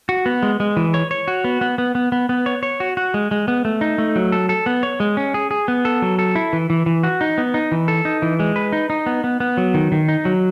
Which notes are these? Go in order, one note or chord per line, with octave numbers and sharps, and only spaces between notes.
F#4
B3
G#3
G#3
E3
C#5
C#5
F#4
B3
B3
B3
B3
B3
B3
C#5
C#5
F#4
F#4
G#3
G#3
B3
A3
D#4
A3
F#3
A4
A4
B3
C#5
G#3
C#4
G#4
G#4
B3
A4
F#3
A4
E4
E3
E3
E3
F#4
D#4
B3
D#4
E3
A4
D#4
E3
G#3
B4
D#4
D#4
B3
B3
B3
F#3
D#3
D#3
D#4
F#3